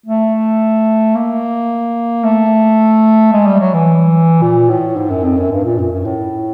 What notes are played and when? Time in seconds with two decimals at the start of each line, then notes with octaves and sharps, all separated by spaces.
0.06 A3
1.15 A#3
2.24 A3
3.33 G#3
3.46 G3
3.60 F#3
3.74 E3
4.42 A#2
4.69 A2
4.96 G#2
5.10 F#2
5.24 F2
5.37 F#2
5.51 G2
5.64 A#2
5.78 F#2
5.92 F#2
6.05 A2